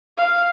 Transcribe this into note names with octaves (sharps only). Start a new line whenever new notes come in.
F5